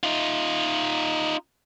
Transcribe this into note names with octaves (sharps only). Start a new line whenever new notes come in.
D#4 F4